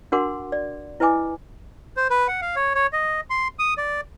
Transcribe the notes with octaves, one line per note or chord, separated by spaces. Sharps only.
D4 F#4 A#4 F#5 C6 D6
D5
E4 B4 D#5 G#5 D6
C5
B4
F#5
F5
C#5
C#5
D#5
C6
D#6
D5